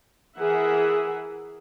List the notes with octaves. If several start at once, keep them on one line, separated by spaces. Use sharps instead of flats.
E3 G#4 A#4 E5 F#5